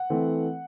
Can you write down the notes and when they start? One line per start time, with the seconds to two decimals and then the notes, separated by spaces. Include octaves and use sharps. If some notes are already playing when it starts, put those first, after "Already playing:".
Already playing: F#5
0.10 E3 A3 C4